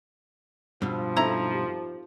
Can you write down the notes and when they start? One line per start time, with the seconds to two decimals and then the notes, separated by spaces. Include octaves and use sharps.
0.82 G2 B2 F3
1.16 C4 D#4 E4 A4 A#5
1.54 G4